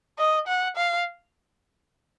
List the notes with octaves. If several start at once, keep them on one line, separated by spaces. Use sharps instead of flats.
D#5
F#5
F5